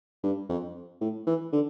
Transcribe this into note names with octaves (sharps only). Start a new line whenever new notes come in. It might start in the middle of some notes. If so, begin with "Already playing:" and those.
G2
F2
A2
E3
D3